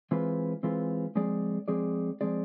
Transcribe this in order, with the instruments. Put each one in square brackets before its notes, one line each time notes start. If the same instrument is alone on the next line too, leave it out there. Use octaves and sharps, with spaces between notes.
[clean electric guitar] E3 G#3 C4 F4 B4
E3 G#3 C4 F4 B4
F3 G#3 C4 G#4 D5
F3 G#3 C4 G#4 D5
F3 G#3 C4 G#4 D5